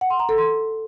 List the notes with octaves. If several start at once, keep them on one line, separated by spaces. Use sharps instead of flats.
F#5
C6
A#5
A4
C6